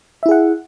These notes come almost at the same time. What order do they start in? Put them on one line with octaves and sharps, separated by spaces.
E5 E4 G#4 F#5